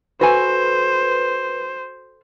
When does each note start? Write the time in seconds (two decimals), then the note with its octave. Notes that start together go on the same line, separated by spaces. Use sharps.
0.21 F#4 A4 B4 C5 G#5